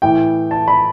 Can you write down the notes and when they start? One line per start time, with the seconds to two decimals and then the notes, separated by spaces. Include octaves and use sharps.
0.02 A2 E3 G5
0.51 A5
0.68 B5